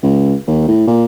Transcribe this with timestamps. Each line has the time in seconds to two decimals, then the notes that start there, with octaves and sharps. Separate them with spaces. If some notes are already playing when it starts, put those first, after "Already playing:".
0.03 C#2
0.47 D#2
0.68 A2
0.87 A#2